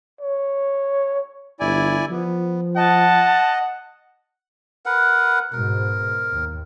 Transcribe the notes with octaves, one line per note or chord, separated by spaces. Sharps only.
C#5
G1 E4 D5 G#5
F3 B3
D#5 F#5 A5
A#4 B4 F#5
G#2 B2 A#4
D#2